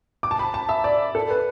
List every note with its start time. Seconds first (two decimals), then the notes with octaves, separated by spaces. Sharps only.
0.23 D6
0.31 A5
0.39 B5
0.54 A5
0.69 E5
0.84 D5
1.15 A4
1.30 B4